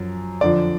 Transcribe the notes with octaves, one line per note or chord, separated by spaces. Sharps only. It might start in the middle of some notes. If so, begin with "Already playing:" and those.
Already playing: F#2 F3
F2 D3 F3 D5